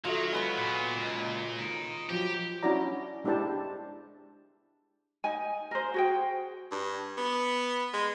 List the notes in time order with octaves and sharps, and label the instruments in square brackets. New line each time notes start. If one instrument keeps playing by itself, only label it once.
[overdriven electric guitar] D#3 [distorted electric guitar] F#3 [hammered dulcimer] F4 [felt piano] F#4 A4 E5
[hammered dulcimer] G#3 B4 C#5 [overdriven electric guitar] B3
[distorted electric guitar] A#2
[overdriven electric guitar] C#2
D#4 A#4
[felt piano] F3 F#3 [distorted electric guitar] G4
[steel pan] C#4 D4 E4 F#4 D5 A#5
G#3 D4 E4 G4 C5 A5
[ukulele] D#4 G#5
A#4 C5
F#4 G#4 G5
[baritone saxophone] G2
B3
G#3